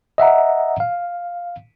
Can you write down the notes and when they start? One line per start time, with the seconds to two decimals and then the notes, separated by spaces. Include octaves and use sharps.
0.18 D#5 E5 F#5 A#5
0.80 F5